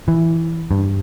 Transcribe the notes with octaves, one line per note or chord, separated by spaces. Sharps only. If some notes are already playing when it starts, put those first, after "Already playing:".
E3
G2